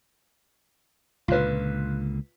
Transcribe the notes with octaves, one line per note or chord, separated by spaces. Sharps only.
C#2 A#2 D3 F4 B4